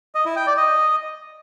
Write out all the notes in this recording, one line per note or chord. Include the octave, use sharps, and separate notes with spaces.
D#5
E4
G5
D5
D#5